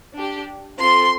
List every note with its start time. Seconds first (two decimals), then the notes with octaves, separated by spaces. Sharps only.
0.14 D4 G4
0.80 C4 F4 A4 C6